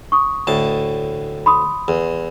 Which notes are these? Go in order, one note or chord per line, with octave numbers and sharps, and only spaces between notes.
C#6 D#6
D2 A2 A5
B5 C6 D#6
E2